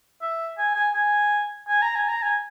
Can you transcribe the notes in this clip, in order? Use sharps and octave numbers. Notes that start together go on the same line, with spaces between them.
E5
G#5
G#5
G#5
G#5
A#5
G#5
A#5
G#5